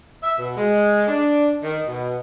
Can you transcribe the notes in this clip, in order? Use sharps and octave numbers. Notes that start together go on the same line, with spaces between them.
E5
B2
G#3
D4
D#3
B2